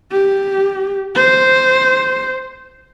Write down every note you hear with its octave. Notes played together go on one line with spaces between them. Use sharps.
G4
C5